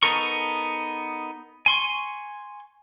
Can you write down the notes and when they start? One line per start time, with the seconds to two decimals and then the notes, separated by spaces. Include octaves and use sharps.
0.03 B3 D#4 A4 A#4 C#6
1.66 G#5 C6 C#6